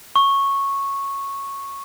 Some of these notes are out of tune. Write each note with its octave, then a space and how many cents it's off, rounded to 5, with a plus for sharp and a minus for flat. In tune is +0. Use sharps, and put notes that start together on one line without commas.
C#6 -10